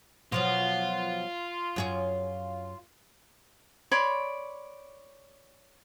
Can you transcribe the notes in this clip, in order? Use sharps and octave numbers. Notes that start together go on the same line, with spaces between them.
B2 F3 F#3 F4
F#2 G#4 C#5
C#5 D5 B5 C6